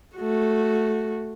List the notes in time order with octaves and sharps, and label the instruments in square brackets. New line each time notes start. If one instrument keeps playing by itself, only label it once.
[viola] A3 F#4